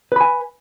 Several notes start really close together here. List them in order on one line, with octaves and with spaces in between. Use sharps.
B4 B5 G#5